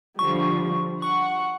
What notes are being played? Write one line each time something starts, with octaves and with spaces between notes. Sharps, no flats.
D3 F3 G3 C#6
F#5 C#6